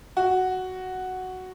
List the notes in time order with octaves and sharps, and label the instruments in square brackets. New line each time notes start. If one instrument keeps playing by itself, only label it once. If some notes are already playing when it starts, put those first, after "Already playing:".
[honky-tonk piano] F#4